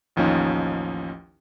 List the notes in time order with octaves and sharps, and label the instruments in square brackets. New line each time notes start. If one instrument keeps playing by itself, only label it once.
[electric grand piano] A1 D#2 F3 C#4 D#4